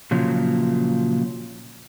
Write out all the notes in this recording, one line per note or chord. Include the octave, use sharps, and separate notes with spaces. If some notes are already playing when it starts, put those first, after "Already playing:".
A#2 C#3 F3 F#3